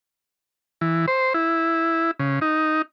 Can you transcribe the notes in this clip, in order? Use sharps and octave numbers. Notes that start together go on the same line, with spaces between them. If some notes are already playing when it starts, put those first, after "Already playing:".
E3
C5
E4
C#3
D#4